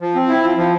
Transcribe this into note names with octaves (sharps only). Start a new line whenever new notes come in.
F3
C4
E4
F3
F3